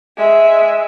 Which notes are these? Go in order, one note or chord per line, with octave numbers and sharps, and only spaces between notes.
G#3 E5